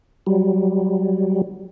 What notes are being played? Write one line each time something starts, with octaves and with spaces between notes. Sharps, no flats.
F#3 G3